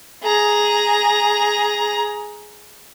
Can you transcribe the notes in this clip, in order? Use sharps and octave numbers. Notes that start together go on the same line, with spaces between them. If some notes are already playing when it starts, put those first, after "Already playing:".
G#4 A#5